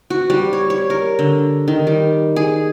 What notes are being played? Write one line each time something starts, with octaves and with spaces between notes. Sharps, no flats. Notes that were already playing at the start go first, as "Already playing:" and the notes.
F#4
G3
C#5
C#5
A#4
D3
D#3
G3
G#4